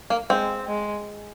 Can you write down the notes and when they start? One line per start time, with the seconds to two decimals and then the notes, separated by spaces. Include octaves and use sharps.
0.10 A#3
0.30 G#3 C4
0.67 G#3